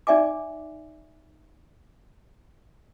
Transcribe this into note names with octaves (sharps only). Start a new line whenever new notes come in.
D#4 D5 E5 G#5 D6